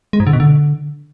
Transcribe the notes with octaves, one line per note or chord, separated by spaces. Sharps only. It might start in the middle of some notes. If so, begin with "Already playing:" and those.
G#3
G#2
D3
B2
D3